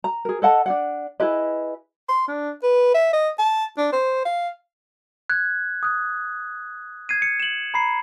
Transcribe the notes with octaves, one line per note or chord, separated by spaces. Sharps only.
A#5
G#4 A#4
A4 D#5 F#5 A5
D4 D5 F#5
E4 G#4 B4 D#5
C6
D4
B4
E5
D#5
A5
D4
C5
F5
F#6 G#6
D#6 F#6
G#6 C7 D#7
C#7
E7 F#7
A#5 B5 C7